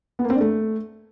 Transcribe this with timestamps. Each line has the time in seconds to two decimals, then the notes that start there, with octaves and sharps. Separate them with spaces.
0.19 B3
0.24 A#3
0.30 C4
0.35 D4
0.41 A3